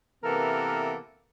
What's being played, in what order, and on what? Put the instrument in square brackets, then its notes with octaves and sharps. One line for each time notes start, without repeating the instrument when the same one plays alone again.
[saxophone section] C3 E3 A#3 B3 A4 A#4